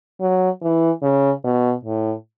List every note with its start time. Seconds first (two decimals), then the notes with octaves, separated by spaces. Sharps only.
0.21 F#3
0.62 E3
1.02 C#3
1.44 B2
1.85 A2